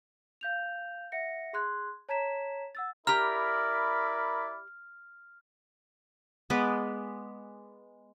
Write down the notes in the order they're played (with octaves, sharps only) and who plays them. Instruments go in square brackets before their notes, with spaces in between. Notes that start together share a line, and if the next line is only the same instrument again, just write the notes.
[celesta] F5 G6 F7
E5 F#5 A#6 C#7
G#4 C6 F#6 G#6
C#5 A5 A#5 G#6 B6 E7
F#5 E6 A6
[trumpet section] E4 D5 B5 [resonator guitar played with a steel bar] G4 A#5 [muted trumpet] A#4 [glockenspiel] F6
[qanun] G#3 B3 B4 D5